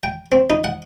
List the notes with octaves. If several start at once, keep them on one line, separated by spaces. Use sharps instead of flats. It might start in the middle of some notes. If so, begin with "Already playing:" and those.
G5
C4
D#4
F#5